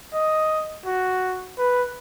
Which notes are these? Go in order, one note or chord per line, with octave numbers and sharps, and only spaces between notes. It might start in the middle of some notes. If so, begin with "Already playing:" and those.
D#5
F#4
B4